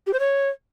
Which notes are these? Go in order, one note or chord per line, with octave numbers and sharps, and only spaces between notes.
G4
C5
C#5